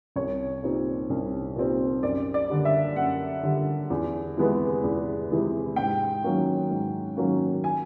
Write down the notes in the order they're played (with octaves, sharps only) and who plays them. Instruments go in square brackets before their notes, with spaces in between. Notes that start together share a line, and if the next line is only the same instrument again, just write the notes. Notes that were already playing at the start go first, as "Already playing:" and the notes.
[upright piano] C2 C#5
A#2 G3 C4 D#4
C2
A#2 G3 C4 D#4
F#2 D5
D5
D3 G3
E5
F#2 F#5
D3 G3
E2
C3 E3 G#3 B3
E2
C3 E3 G#3 B3
G#2 G5
D#3 F#3 A#3 C#4
G#2
D#3 F#3 A#3 C#4
G#5